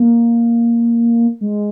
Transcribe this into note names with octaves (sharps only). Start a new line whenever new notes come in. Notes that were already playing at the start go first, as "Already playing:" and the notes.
Already playing: A#3
G#3